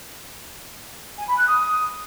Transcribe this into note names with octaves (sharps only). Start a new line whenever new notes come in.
G#5
B5
F#6
D#6